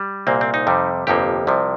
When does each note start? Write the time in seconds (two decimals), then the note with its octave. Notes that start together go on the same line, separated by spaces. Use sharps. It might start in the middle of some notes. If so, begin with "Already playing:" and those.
Already playing: G3
0.27 C2 A#2 A#3 C4
0.41 C4
0.54 D#4
0.67 F2 C3 G3
1.07 G1 F2 C3 F3 A#3 G4
1.47 C2 C3 F3